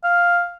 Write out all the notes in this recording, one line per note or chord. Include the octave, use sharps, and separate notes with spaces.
F5